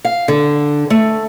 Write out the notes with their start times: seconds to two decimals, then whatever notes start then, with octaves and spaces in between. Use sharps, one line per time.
0.05 F5
0.28 D3
0.90 A3